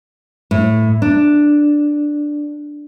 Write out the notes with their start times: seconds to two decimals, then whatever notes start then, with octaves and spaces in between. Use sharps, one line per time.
0.51 A2
1.02 D4